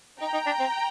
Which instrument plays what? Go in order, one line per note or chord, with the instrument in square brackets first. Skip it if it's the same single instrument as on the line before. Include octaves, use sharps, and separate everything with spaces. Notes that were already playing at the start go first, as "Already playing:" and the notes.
[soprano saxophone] D#4 [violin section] G5 A#5
[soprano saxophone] D#4
D4
C4